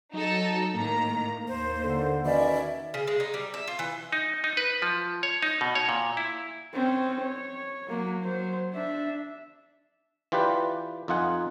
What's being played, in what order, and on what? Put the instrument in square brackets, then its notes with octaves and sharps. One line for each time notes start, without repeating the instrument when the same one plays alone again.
[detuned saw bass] F#3 [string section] D#4 A4
[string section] A2 D#3 A#5 [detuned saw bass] A#3
[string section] D#2 [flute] C5
[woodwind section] D3
[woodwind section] B2 C#4 D5 [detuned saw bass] D#3 [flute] E5
[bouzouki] C#3
G#3
D#4
G3
E5
F4
E3
[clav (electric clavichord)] D#4
D#4
B4
F3
C#5
D#4
B2
C#5
A#2
E4
[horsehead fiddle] C4 C#4
C#5
F#3 A#3
F#3 C5
D4 E5
[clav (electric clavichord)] E3 F4 G4 B4 D5
F2 D#4 F4 F#5 G#5